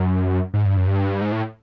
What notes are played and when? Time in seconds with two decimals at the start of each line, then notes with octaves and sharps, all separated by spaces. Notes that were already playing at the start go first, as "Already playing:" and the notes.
Already playing: F#2
0.54 G#2
0.65 G2
0.77 F#2
0.87 G2
1.21 G#2
1.32 A2